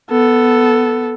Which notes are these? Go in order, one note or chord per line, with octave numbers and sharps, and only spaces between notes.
B3 A4